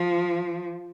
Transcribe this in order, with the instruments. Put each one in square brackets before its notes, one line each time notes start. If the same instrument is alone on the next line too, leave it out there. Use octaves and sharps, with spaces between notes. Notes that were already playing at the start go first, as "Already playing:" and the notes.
Already playing: [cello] F3